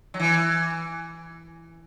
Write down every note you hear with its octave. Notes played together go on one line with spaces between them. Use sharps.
F#3
E3